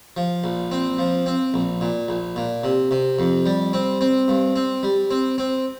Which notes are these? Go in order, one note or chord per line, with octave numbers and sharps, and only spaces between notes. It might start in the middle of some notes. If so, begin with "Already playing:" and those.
F3
A#1
C4
F3
C4
A#1
A#2
A#1
A#2
C3
C3
F2
G3
C4
C4
G2
C4
G3
C4
C4